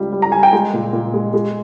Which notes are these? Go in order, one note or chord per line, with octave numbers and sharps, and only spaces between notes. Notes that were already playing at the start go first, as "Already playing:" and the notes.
Already playing: C#2 G3
G3
A#5
G3 G#5
G5
G#3
A#2
A#2
G#3
G#3